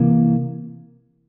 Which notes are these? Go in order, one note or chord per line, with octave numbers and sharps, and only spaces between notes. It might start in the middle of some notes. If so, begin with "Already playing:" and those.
Already playing: C3 E3 A#3